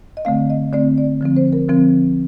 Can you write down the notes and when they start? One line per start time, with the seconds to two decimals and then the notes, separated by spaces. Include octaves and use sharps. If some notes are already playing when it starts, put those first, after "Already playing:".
0.17 D#5
0.25 D3 A3 C4 F5
0.50 D#5
0.73 D3 A3 C4 D5
0.98 D5
1.21 D3 F3 C4
1.36 C5
1.53 A#4
1.68 D3 F3 C4